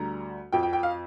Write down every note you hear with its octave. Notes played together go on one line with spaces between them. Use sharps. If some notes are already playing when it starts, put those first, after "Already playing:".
Already playing: D2 D3 G3 A#5
F2 F3 G5
G5
G5
F5